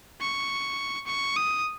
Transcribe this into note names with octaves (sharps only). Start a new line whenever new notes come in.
C#6
C#6
D#6